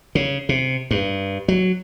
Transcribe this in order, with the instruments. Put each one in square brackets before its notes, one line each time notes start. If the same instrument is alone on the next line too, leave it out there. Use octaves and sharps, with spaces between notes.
[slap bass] C#3
C3
G2
F#3